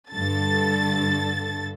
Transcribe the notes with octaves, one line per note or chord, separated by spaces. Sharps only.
G2 D3 A4 A6